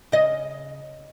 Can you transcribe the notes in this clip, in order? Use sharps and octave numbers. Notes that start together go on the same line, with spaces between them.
C#3 D#5